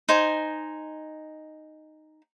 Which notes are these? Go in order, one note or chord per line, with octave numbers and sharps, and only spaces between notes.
D#4 C5 G#5